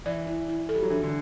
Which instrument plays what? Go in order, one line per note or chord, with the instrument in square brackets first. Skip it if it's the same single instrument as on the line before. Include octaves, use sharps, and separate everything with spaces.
[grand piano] E3 [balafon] D5
[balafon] E4
E4
A4
[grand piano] G3
F#3
[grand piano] E3 [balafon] D4
[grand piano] D3